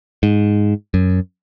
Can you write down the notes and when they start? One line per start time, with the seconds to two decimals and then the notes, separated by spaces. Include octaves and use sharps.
0.23 G#2
0.94 F#2